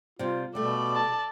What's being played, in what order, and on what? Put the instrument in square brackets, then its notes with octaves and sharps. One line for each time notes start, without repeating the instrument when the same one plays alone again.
[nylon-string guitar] C3 G3 [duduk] F4
[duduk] B2 [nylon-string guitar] G3 A3 [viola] A4 D5
[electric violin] A5